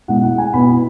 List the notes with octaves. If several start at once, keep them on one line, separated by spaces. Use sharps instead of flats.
B2 G#3 E4 F#5
F#5
G#5
B2 B3 E4 B5